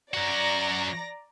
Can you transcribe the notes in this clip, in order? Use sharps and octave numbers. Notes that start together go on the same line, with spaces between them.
F#2 F#4 D5 A#5 A#6